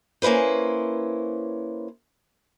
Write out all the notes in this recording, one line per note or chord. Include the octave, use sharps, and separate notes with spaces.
A#3 C#4 E4 B4 C5